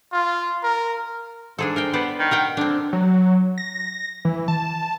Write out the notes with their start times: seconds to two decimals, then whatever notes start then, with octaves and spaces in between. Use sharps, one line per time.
0.13 F4
0.63 A#4
1.58 G#2 D4 G#4 A4
1.76 A#4 C5 G5
1.93 B3 C5 D5
2.19 D#3
2.31 A#4 F#5 G5
2.57 D3 C4 D4
2.93 F#3
3.58 A#6
4.25 E3
4.48 A5